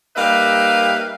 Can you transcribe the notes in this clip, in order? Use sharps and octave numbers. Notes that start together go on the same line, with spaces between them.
G3 A#3 D#4 B4 E5 F5